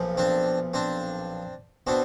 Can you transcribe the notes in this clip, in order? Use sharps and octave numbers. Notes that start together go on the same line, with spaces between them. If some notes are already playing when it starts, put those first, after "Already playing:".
Already playing: B1 A#2 F3
C4 D4
C4 D4
B2 C4 D4